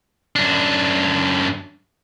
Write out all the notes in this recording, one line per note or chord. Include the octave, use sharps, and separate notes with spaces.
F#2 D4